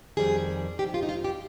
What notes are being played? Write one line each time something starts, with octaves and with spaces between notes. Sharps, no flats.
F2 D#3 G3 G#4
F2 D#3 G3 G4
F4
D#4
F4
G4